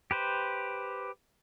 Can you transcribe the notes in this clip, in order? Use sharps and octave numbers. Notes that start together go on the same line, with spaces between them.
G4 B4 C5